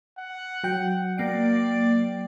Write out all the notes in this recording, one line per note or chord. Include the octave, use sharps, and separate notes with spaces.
F#5
F#3 G5
A#3 D5 C7 D7